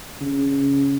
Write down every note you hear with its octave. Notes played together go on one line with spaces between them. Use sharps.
C#3